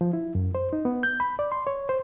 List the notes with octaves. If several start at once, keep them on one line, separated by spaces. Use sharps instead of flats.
F3
E4
F#2
C5
D#4
B3
G6
B5
D5
C6
C#5
C5